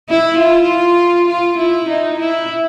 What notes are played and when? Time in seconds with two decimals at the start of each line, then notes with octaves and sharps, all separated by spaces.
0.09 E4
0.39 F4
1.28 F4
1.58 E4
1.88 D#4
2.19 E4